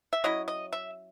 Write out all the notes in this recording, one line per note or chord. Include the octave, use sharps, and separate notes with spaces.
E5
F#3 C#4 E4 D#5
D#5
E5